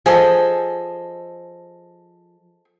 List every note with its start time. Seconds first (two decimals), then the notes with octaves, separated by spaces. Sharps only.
0.06 F3 G#4 A4 D#5